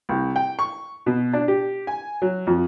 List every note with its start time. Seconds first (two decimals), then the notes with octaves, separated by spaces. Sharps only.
0.09 C2
0.36 G5
0.59 C#6
1.06 B2
1.33 D4
1.48 G4
1.87 G#5
2.22 F#3
2.47 F2